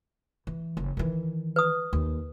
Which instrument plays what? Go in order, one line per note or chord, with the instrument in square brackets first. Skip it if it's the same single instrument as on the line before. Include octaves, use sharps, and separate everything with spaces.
[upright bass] E3
F#1
D#3 E3
[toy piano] B4 D#6
[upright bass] D#2